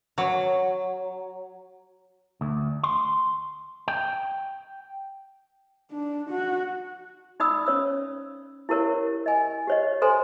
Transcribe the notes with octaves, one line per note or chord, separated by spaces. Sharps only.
F#3
D2
C6
G5
D4
F#4
D#4 D5 B5 D#6 E6
C#4 C#5 E6
E4 G4 A#4 C#5
D#5 G#5
G4 C#5 D#5
A4 C5 G#5 A#5 C6